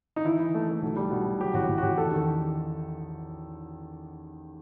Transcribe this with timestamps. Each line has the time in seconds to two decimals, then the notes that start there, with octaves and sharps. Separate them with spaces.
0.16 D#4
0.25 E3 E4
0.40 E3
0.54 A3
0.68 A3
0.82 B1
0.96 G3
1.11 B2
1.25 B2
1.40 F#3 G4
1.54 A1 F#4
1.69 A1
1.78 F#4
1.83 A1 G4
1.97 E2 A4
2.11 D#3